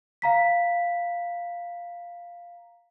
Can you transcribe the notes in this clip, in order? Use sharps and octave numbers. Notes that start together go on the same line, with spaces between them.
F5 A#5 B6